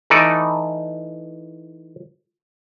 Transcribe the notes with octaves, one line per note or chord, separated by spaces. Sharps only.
E3 A3 D#4 A4 D5